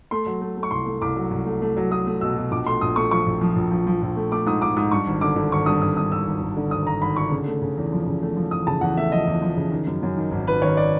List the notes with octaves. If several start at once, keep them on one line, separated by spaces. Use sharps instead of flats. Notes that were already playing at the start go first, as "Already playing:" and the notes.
A3 C6
F#3
A3
A3
C#6
C2 C6
A3
C2 D6
F#3
C2
A3
A3
F#3
A3 D#6
A3
B2 E6
B2
A#1 D6
A3 C6
A#1 D#6
A3 C#6
F3 C#6
A#1
F3
A#1
F3
F3
A#1
A3
A3 D6
G#2 D#6
G#2 D6
G#2 D#6
G2 C#6
G#1
D3 D6
D3
G#1 C#6
G2 D#6
G#1 D#6
G2 D#6
G#1 E6
G#1
G#1
D3
G#1 D#6
G#1 A#5
G#1 B5
D3 C#6
C#3
A3
C#3
E2
F3
C#3
A3
F3
E2 D#6
C#3 A5
E2 F#5
A3 E5
F3 D#5
E2
F3
C#3
D#3
F#2
F#2
D#3
G#1
G#1 B4
D#3 C#5
D5